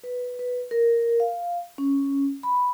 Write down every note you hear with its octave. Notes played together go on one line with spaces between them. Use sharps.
B4
B4
A#4
F5
C#4
B5